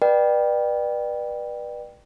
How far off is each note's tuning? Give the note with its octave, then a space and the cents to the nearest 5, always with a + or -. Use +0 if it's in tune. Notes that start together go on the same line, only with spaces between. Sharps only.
B4 -25 D5 +30 G5 +0